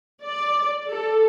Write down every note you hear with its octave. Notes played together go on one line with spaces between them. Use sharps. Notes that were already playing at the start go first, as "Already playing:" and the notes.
D5
A4